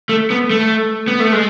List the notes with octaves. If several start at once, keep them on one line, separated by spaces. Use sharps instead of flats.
A3
B3
A3
B3
A3
G#3